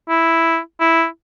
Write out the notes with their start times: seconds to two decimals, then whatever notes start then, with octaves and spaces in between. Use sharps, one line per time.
0.09 E4
0.81 E4